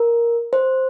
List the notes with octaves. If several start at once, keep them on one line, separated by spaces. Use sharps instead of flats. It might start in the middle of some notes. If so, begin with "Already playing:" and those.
Already playing: A#4
C5